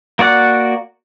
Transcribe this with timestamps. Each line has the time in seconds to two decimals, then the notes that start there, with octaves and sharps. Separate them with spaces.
0.19 A#3 F#4 D5 F#5